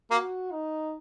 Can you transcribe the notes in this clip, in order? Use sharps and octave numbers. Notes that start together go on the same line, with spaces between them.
A#3 F#4
D#4